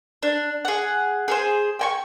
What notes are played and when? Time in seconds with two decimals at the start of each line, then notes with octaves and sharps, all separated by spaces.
0.23 D4
0.65 G#4 F#5
1.28 G#4 A4 C5
1.79 G5 G#5 C#6